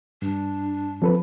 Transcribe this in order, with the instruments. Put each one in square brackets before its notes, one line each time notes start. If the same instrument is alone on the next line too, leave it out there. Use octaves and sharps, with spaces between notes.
[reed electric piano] G2 [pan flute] D4
[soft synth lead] F3 [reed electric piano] C4 A4 B4